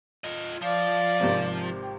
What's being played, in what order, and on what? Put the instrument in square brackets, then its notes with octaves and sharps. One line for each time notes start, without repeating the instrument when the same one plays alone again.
[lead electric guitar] F4 D#5
[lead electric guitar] F3 [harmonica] D5 [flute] F5
[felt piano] G#1 C3
[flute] G5